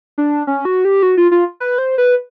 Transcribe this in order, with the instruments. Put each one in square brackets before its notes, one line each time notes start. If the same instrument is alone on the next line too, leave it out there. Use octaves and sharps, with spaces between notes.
[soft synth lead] D4
C#4
F#4
G4
F#4
F4
F4
B4
C5
B4